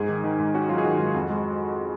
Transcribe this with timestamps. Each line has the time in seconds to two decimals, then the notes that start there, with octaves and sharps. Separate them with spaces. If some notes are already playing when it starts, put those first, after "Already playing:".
Already playing: G#2 G#4
0.09 D#3
0.24 D#3
0.40 G#2
0.54 C#4 F#4
0.69 F#3 F4
0.78 G#4
0.84 D#3 F#4
0.99 G#2
1.15 F2
1.30 G#3